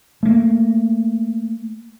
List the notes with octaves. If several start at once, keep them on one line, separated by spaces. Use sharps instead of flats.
A3 A#3